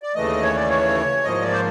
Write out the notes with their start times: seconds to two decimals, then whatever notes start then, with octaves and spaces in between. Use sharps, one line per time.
0.03 D5
0.15 D#2 C#3 E3 A3 D#5
0.43 C#5
0.55 D5
0.69 C#5
1.24 G#2 F3 A#3 D#5
1.42 D5
1.53 C5